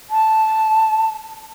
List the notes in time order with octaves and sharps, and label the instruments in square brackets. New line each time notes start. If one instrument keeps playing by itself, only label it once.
[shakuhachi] A5